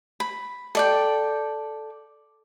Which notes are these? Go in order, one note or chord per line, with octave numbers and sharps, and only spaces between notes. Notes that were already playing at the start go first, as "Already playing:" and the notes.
B5
A4 D5 G5